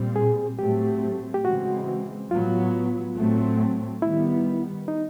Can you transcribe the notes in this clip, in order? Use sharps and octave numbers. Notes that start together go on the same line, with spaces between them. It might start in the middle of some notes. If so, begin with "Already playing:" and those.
Already playing: A#2 G3 C4
G#4
A2 F#3 A3 C4 G4
G4
C#3 E3 G#3 C4 F#4
A2 F#3 B3 F4
A2 F#3 A3 C4
D#3 G3 B3 E4
D#4